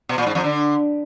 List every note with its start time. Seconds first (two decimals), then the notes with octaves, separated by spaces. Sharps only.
0.09 B2
0.18 A#2
0.27 G#2
0.35 F2
0.44 D3